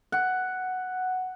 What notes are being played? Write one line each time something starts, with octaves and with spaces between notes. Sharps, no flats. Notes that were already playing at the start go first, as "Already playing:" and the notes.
F#5